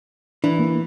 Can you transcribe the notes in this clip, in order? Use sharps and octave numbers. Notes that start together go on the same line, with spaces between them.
E3 D4
A#3